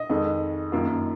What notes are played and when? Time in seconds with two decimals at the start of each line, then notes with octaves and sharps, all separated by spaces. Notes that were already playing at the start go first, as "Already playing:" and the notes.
Already playing: D#5
0.10 F2 D#3 G#3
0.72 F#2 D#3 A#3 F4